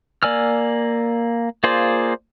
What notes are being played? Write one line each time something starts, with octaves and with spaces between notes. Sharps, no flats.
A#3 D5 G#5 E6 F6
A#3 F4 G#4 C5 D5